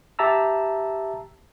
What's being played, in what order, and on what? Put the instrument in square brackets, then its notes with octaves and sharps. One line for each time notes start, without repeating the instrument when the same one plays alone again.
[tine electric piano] G4 E5 A5 A#5 E6